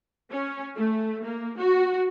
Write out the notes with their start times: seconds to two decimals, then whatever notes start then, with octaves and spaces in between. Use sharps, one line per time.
0.30 C#4
0.76 A3
1.25 A#3
1.59 F#4